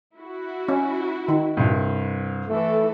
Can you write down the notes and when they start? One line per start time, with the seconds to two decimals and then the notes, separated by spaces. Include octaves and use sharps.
0.16 E4 F#4
0.69 C#4
1.28 D#3
1.57 C2 G2
2.48 E3 A3 A4